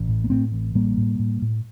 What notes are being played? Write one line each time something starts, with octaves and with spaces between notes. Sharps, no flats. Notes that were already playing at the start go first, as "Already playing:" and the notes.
Already playing: A1
A2
A#3
A2 A3 C4
A1
A2 G3 A#3
A2
A2
A2